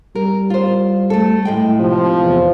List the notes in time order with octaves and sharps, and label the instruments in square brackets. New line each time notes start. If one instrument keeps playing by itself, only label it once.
[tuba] G3 [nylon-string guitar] A#4
[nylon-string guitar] F4 C5
A3 A4
A2 G#3 G5
[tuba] C3 [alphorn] F3
[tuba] E2